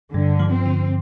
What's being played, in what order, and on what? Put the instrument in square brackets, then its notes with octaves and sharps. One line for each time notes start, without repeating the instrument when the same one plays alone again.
[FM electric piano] G2 [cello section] D3
[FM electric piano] F3
[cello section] C4
[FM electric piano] D3